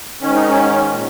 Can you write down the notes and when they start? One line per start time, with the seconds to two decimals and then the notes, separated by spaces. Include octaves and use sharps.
0.21 G#2 D#3 C#4
0.35 D#4
0.48 C#4
0.89 A#2